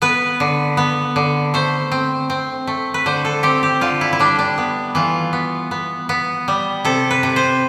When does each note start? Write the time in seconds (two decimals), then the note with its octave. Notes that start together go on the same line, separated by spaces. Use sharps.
0.02 B3 B4
0.40 D3
0.77 B3
1.16 D3
1.54 A3 C5
1.92 C4
2.30 C4
2.67 A3
2.94 B4
3.06 D3 C5
3.25 A4
3.43 C4 G4
3.63 G4
3.81 D3 F4
4.01 E4
4.13 E4
4.19 G3 D4
4.39 D4
4.58 B3
4.95 E3 F4
5.33 B3
5.71 B3
6.09 B3
6.48 G3
6.85 C3 A4
7.11 B4
7.23 C3
7.36 C5